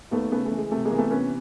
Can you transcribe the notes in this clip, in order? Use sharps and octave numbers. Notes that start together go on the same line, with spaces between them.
D#2 A3 B3
C#3 A3 B3
A3
E3
G#3
C3 A3
G#3 A#3
E3
A3 B3
C3 B3 C#4